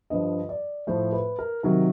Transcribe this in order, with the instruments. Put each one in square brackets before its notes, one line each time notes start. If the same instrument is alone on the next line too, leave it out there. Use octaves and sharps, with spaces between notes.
[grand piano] G2 D3 F3 D#5
D5
A2 F3 A3 C5
B4
A#4
C3 D#3 F#3 A#4